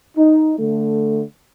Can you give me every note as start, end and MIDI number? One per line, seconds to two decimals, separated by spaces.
0.17 0.55 63
0.59 1.22 50
0.59 1.22 57